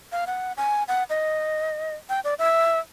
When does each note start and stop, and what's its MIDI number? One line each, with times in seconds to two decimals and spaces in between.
0.12 0.25 77
0.27 0.53 78
0.57 0.83 80
0.88 1.04 78
1.10 1.95 75
2.09 2.20 79
2.24 2.34 74
2.39 2.79 76